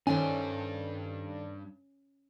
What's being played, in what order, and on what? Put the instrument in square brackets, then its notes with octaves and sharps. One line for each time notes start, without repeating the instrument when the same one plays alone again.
[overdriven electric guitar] G2 D4 [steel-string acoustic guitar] D#3 A4 C5 [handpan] C#4 [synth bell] G#5